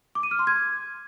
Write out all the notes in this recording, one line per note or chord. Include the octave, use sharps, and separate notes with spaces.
D6
D#7
F6
C6
G#6